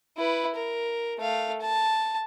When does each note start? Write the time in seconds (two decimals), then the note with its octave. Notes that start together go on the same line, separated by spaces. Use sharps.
0.17 E4 B4
0.55 A#4
1.19 A3 F5
1.61 A5